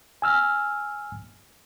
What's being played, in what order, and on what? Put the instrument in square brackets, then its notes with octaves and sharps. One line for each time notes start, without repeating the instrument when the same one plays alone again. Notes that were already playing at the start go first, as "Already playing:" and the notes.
[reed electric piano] G#5 E6 F6